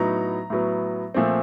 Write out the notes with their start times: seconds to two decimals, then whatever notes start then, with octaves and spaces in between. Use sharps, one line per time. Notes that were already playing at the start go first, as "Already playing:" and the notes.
Already playing: A2 F#3 B3 D#4 A#5
0.50 A2 F#3 B3
1.14 A#2 F3 A3 C4